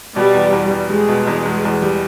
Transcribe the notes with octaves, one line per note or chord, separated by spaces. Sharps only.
B2 G3
E2
E2
G3
G3 G#3
B2
E2
E2
E2
G3